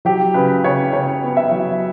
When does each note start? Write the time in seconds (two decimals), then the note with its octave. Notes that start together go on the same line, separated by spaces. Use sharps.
0.05 F#3 G4
0.34 C#3 B4
0.64 C#3 C#5
0.92 C#3 C#5
1.23 B3
1.37 E5
1.51 F#3